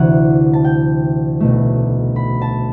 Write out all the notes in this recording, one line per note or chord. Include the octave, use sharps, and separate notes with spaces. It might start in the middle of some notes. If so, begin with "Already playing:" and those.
Already playing: D2 C3 E3 F#5
A5
G5
B1 B2 A3
B5
A5